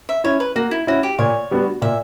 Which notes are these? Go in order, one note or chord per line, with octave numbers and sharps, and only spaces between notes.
E5
C#4 E4 C#5
B4
A#3 F#4
E4
C#4 E4 F#4
G4
A#2 C#5
G3 B3 D4 F#4
A#2 E5